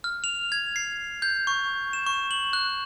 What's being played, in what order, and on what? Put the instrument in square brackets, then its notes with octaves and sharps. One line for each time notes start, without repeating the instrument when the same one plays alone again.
[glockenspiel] F6
F7
G#6
C7
G6
C#6
E7
C#6
F#7
F#6